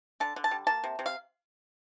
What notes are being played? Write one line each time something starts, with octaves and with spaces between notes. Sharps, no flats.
D3 A5
D3
A5
G3
A#3 A5
C3
C3
F5